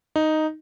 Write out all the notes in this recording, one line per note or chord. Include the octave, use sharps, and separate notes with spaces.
D#4